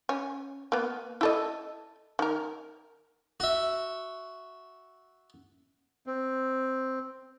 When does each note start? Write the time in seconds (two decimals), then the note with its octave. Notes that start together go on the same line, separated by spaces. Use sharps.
0.09 C#4
0.72 A#3 B3
1.21 E4 A4 D#5
2.19 D#3 A#4
3.40 F#4 E5
6.07 C4